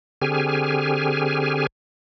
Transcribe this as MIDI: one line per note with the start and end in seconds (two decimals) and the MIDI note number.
0.22 1.67 50
0.22 1.67 60
0.22 1.67 67
0.22 1.67 68
0.22 1.67 80
0.22 1.67 89